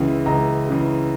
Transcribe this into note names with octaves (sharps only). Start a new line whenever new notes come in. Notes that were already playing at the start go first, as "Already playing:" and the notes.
Already playing: C#2 C#3 E3
C#2 A#5
C#3 E3